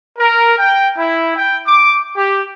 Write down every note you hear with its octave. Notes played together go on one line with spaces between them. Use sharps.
A#4
G5
E4
G5
D6
G4